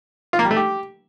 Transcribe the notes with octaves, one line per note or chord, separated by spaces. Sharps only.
F4
A#3
G3
A3
G4